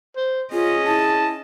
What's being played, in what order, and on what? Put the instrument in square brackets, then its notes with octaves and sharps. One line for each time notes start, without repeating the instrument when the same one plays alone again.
[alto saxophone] C5
[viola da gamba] C#4 D#5 [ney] F4 [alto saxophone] G#4
[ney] E4 [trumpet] A5